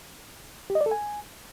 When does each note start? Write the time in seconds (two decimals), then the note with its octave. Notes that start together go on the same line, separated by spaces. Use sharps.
0.70 G4
0.75 D#5
0.81 D5
0.86 A4
0.91 G#5